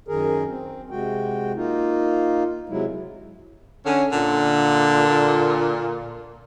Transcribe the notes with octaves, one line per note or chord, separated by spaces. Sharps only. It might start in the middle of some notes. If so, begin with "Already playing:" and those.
F#2 D#3 G#4 A#4
C4
C3 G#3 F#4 G5
A#3 D#4 F4
C3 F#3 G#3 E4
D3 C#4
A#2 D3